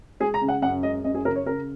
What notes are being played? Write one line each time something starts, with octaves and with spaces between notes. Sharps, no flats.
G#3 G#4
A#5
C#3
F#5
F#2 F#5
G#3 D#5
F#2 D#5
G#4
C#3 A#4
C#5
C#3 A#4